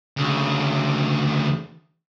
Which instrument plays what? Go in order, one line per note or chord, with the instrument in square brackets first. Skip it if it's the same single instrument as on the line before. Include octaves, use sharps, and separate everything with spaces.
[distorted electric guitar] D2 C#3